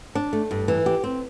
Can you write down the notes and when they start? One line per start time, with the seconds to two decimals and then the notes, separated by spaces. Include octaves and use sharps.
0.15 D4
0.33 A3
0.51 G2
0.68 E3
0.86 G4
1.04 C4